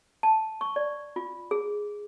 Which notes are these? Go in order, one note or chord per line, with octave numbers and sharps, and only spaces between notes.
A5
C#6
D5
F4
G#4